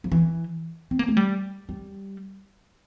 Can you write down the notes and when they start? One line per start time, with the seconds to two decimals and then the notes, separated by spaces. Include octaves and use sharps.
0.04 F3
0.12 E3
0.91 C4
0.99 A#3
1.08 A3
1.17 G3
1.69 G3